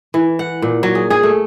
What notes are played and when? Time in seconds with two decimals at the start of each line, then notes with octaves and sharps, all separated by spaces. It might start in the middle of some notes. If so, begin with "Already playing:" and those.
0.14 E3
0.39 F#5
0.62 A#2
0.83 F#3
0.95 G#4
1.10 G#4
1.23 A3